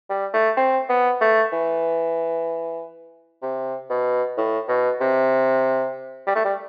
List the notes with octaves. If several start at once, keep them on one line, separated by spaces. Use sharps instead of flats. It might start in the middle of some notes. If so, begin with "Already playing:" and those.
G3
A3
C4
B3
A3
E3
C3
B2
A2
B2
C3
G3
A3
G3